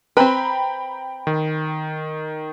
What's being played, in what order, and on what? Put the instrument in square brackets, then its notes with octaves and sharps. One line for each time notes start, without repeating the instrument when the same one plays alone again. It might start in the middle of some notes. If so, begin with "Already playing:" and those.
[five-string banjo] C4 B4 [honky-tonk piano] G5 A#5 B5
[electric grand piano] D#3